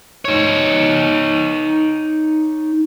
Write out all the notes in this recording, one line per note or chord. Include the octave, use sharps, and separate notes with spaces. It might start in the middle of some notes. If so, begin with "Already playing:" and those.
D#4 C#5